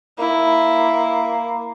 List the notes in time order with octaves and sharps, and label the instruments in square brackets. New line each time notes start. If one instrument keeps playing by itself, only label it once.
[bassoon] A#3 [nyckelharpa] E4